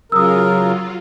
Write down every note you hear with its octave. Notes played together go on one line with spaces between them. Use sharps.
C#3 F#3 F4 A#4 D#6 E6